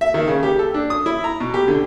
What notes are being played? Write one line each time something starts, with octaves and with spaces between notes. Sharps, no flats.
E5
D#3
C#3
G4
A4
D4
D#6
E4
A#5
B2
G4
D3